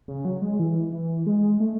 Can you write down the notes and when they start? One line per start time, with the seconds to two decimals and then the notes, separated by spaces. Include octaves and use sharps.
0.08 C#3
0.25 F#3
0.42 G#3
0.60 E3
0.92 E3
1.27 G#3
1.60 A3